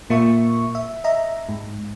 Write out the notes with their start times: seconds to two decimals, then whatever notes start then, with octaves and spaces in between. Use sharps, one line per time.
0.10 A#2 A#3 F4 E5 C#6
0.75 E5
1.04 D#5 E5 A#5
1.49 G#2